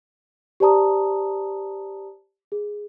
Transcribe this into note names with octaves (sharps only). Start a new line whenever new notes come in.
G4 C5 D5 A5 A#5 D#6
G#4